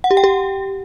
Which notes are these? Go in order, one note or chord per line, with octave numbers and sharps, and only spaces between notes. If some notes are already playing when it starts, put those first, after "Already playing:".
F#5
G4
G5
G4